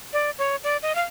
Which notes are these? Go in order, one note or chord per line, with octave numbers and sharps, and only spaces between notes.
D5
C#5
D5
D#5
F5